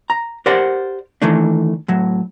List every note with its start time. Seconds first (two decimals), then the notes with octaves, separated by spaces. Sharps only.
0.10 A#5
0.46 G4 A#4 C5 D5 F#5
1.22 D#3 E3 A3 D4
1.88 A2 F#3